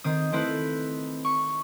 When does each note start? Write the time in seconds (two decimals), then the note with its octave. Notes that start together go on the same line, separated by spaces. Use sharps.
0.04 D#3 C4 D#6
0.32 A3 C4 E4 B4
1.25 C#6